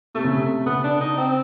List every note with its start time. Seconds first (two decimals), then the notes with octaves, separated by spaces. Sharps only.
0.15 C3 A3
0.24 C#3
0.34 C3
0.66 C#3 B3
0.84 D4
1.01 D#4
1.18 C4